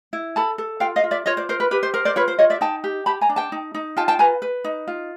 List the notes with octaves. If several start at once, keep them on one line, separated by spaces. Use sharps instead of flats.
E4
A4 A5 B5
A4
F4 F5 G5
D#5 F5
F4
D5 E5
F4 C#5 D#5
C5 D5
A#4 C5
B4
G4 B4
C5
A#4 C5
C5 D5
F4 B4 C#5
C5
F4 C#5 D#5
D5 E5
D#4 G5 A5
G4
G4 A5 B5
G#5 A#5
D4
G5 A5
D#4
D#4
F4 G5 A5
G5 A5
B4 G#5 A#5
B4
D#4
F4